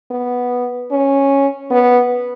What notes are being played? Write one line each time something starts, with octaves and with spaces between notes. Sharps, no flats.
B3
C#4
B3